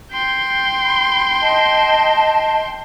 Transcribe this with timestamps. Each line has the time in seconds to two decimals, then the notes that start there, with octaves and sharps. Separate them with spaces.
0.12 G5 C6
0.82 B5
1.42 D#5 A5